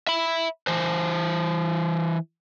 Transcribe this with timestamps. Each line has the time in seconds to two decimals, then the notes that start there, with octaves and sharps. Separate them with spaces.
0.07 E5 B5
0.67 E3 C5